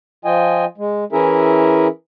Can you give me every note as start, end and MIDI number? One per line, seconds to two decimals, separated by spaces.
0.25 0.65 53
0.25 0.65 65
0.25 0.65 75
0.25 0.65 79
0.25 0.65 80
0.78 1.04 56
1.12 1.87 52
1.12 1.87 61
1.12 1.87 64
1.12 1.87 68
1.12 1.87 70
1.12 1.87 76